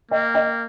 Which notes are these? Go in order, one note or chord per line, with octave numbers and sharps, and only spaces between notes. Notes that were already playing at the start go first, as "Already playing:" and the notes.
A#3 D#5 G5
D#5 G5